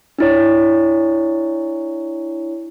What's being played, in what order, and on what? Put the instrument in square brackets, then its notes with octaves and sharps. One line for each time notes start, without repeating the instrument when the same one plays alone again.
[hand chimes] D4 E4 C#5